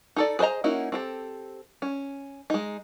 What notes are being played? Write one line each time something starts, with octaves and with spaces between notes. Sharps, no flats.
D#4 A4 D5
G#4 B4 C5 D#5 A#5
A#3 C#4 D#4 E4 F#4
C4 G4 A4
C#4
G#3 D#4